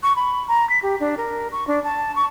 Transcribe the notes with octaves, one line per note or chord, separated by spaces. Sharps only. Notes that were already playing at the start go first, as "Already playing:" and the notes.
C#6
B5
A#5
B6
G4
D4
A#4
C#6
D4
A5
C#6